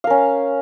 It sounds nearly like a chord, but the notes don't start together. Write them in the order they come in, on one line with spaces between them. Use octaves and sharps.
F5 A#4 C#4